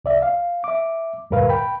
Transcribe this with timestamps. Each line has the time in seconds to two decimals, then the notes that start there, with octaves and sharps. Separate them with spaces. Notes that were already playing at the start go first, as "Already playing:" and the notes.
0.05 C2 D5 E5
0.22 F5
0.64 E5 D6
1.31 D2 G2 A#2 A#4 B4 F5
1.49 G5 B5